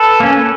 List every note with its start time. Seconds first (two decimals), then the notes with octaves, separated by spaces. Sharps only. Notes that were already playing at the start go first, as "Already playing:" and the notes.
Already playing: A4 B4
0.20 A#3 C#4